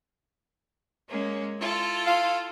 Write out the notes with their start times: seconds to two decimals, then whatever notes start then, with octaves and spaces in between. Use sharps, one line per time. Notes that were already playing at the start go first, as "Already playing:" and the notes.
1.09 G#3 A#3 C#4
1.59 E4 F4 A4
2.07 F5